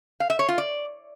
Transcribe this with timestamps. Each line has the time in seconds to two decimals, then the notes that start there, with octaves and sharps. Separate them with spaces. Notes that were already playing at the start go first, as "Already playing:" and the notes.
0.20 F5
0.30 E5
0.39 C#5
0.48 F4
0.58 D5